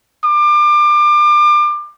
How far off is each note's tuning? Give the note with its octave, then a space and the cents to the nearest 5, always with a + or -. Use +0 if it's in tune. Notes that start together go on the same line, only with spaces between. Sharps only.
D6 +30